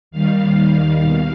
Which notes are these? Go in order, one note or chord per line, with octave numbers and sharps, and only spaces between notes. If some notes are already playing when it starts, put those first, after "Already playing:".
D#2 D#3 G3 F5
B2